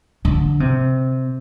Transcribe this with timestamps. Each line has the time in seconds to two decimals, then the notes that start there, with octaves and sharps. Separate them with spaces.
0.25 D3
0.60 C3